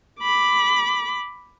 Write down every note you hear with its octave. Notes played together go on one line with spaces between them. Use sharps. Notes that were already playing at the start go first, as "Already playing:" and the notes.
B5 D6